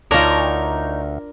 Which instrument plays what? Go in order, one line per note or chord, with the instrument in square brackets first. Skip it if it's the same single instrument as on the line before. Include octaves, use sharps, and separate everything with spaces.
[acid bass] D2 [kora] D4 F4 [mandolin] D#4 C#5 [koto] A#4